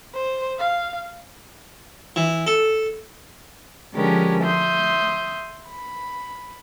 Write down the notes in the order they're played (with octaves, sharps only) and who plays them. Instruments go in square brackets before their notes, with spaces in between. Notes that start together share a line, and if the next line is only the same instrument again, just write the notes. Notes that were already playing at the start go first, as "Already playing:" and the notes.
[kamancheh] C5
F5
[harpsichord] E3
A4
[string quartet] D3 F3 G#3 C#4 G4 A#4
E5 C6 D#6 G6
B5